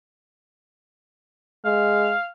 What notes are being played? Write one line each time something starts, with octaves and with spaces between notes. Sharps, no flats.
G#3 F5